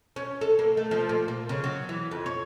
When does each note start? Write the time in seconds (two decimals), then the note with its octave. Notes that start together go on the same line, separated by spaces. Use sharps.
0.16 C#4
0.41 A4
0.59 A#3
0.77 A3
0.91 F3
1.09 A#2
1.28 A#3
1.49 C#3
1.64 F#3
1.89 E3
2.11 F2
2.26 C#5